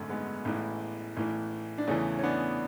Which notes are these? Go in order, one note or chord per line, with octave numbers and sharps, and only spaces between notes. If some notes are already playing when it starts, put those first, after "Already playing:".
Already playing: G#1 F#2 D3 A3
G#3 B3
A1 A2 E3
A1 A2 E3
D4
E2 C#3 E3 A3 C#4
C#4
B3 D4